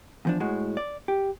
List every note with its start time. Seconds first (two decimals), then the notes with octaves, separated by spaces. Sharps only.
0.25 E2 F3 D4
0.40 A2 G#3 F#4
0.77 D5
1.08 G4